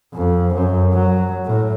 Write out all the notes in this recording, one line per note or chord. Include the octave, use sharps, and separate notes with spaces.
F2
F#2
F#3
A2